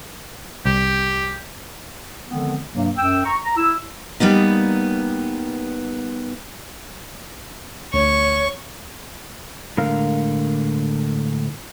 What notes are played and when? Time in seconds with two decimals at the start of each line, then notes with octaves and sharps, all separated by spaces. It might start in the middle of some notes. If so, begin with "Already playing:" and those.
0.65 C2 G4
2.28 D3 D#3 F3 G#3 B3 C4
2.74 G2 C3 F#3 A#3
2.98 F#2 G5 E6
3.25 A#5 C#6
3.45 A#5
3.57 E4 E6
4.20 G3 A#3 B3 D#4
7.94 D2 C#5 C#6
9.77 A2 D3 G#3 A#4 F5